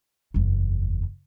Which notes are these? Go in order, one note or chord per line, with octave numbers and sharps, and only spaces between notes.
F#1 E2